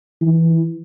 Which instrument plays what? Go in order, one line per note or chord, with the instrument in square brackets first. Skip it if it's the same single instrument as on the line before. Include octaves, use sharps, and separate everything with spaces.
[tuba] E3